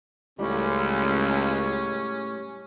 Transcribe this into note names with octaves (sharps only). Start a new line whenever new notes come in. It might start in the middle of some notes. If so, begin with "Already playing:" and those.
C#2 A2 G3 C#4